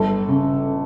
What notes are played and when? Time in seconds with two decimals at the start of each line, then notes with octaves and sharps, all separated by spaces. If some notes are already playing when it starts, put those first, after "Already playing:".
Already playing: G1 A4
0.28 C#3